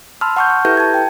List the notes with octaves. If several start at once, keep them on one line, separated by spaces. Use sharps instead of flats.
A5 B5 C6 E6 F6
F#5 A5 C#6 F6 G6
C#6
E4 G4 A4 B4 E5 G6
A5 G#6
G5